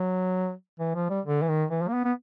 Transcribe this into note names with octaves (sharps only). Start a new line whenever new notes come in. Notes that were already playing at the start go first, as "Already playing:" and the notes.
Already playing: F#3
E3
F3
G3
D3
E3
D#3
E3
F3
A#3
B3
B3